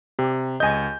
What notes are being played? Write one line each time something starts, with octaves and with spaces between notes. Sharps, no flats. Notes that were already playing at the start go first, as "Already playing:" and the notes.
C3 G4
C#2 D#5 G#5 G6